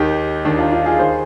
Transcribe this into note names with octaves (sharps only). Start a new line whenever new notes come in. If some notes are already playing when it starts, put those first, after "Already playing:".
Already playing: D#2 D#3 D#4 G4
D#2 D#3 D4
D4 F4
D4 F4
F4 G#4
D#2 D#3 G#4 C5